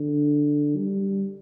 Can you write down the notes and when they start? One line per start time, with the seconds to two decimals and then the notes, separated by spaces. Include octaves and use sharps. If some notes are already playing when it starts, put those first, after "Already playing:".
Already playing: D3
0.77 G3